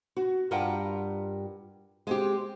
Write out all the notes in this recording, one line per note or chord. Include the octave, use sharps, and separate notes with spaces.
F#4
G2 G3 F4 A#4 F#5 G5
G#3 C4 G4